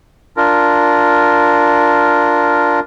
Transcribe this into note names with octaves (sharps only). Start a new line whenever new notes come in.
D4 F4 A#4